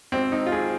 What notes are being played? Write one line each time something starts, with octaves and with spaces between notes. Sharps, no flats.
G#1 C4
G#1 D#4
F4
G#1 G#4